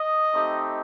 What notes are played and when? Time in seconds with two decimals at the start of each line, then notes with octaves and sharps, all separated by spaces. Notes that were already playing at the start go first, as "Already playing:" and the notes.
Already playing: D#5
0.33 A3 C4 D#4 G4